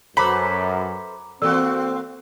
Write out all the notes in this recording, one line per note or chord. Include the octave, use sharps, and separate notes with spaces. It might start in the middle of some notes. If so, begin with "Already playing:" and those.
F#2 A4 B4 C5 A#5 B5 D6
E3 A#3 C4 F#4 A4 D5 E6